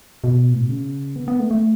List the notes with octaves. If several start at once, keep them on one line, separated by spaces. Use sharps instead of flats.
B2
A2
B2
C#3
B3
B3
A3
A3